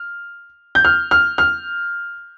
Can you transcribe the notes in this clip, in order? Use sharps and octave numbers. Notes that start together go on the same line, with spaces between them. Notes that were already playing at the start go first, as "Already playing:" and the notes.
Already playing: F6
G6
F6
F6
F6